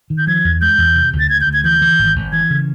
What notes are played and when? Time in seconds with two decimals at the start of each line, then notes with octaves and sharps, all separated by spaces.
0.10 D#3
0.18 G6
0.27 F3 G#6
0.44 E2
0.61 G#3 G6
0.78 E2
0.95 C3
1.13 D2
1.19 A6
1.29 D2 G#6
1.41 G6
1.47 D2
1.53 G#6
1.64 E3 G6
1.82 E3
1.99 G#1
2.15 G#1
2.32 E3 G#6
2.50 C#3